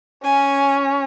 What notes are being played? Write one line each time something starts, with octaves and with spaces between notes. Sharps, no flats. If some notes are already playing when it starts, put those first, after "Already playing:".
C#4 G#5